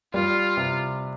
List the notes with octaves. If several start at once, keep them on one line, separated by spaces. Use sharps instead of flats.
G3 F4
C3